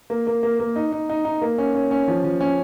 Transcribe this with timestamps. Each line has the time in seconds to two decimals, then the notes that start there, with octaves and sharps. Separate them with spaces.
0.10 A#3
0.27 A#3
0.43 A#3
0.60 A#3
0.76 D#4
0.92 D#4
1.09 D#4
1.25 D#4
1.42 A#3
1.58 C#4
1.75 C#4
1.91 C#4
2.08 F3
2.24 F3
2.41 C#4